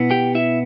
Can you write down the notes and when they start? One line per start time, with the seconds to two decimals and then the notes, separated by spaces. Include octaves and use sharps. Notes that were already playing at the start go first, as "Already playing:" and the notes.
Already playing: B2 B3 E4
0.11 G4 G5
0.35 E4 E5